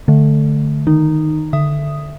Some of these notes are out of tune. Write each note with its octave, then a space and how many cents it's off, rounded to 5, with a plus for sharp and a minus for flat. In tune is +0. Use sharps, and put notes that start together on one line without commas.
D3 +0 A3 -10
D#3 +0 D#4 -10
D3 +0 E5 +15 D#6 +0